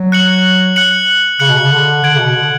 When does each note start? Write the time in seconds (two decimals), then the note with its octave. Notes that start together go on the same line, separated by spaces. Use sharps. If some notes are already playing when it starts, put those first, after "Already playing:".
Already playing: F#3
0.12 F#6 C#7 F#7
0.76 F#6 C#7 F#7
1.40 C#3 F#6 C#7 F#7
1.50 B2
1.58 C#3
1.72 D3
2.04 D3 G#6 D7 F#7
2.15 C#3
2.20 B2
2.35 D3